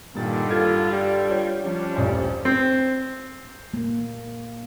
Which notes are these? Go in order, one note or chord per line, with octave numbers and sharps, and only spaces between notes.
G2 A#2 D3 D#3 A6
F4 A4 G#6
G3
F4 C#5
F3 G3 C#4 D4
D#1 A1 C5
C4
A#3